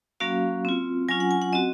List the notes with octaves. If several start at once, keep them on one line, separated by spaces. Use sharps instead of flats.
F#3 A#3 C#4 F#4 F5
C4 F4
F#3 C#4 F4 G#5
F#5
G#5
F#5
C4 F#4 D#5